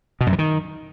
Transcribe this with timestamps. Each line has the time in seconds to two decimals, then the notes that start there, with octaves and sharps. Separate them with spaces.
0.21 B2
0.27 F#2
0.33 E3
0.39 D#3